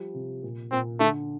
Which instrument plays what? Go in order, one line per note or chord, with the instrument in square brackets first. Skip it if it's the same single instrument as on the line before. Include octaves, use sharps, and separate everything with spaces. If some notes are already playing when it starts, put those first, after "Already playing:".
Already playing: [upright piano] F3 G3
C3
A#2
[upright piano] A#2 [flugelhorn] C4
[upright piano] D3 [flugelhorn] A3